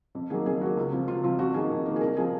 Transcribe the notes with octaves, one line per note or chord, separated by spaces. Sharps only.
F2
D#3 F#3 A#3 G#4
F2 G#4
D#3 F#3 A#3 F#4
C#2
C3 F3
C#2 F4
C3 F3 F4
F2 F#4
D#3 A#3 G#4
F2
D#3 A#3
G#4
C2 A#4
C3 F3 G#4